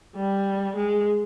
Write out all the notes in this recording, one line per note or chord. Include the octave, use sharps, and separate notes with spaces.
G3
G#3